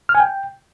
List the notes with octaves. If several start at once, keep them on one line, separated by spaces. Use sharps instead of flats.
F6
G#5
G5